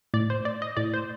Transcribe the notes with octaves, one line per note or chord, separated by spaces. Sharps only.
A2 D5
C5
D5
D#5
A2 D5
C5